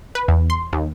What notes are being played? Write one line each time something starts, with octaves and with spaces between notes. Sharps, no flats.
B4
E2
C6
D#2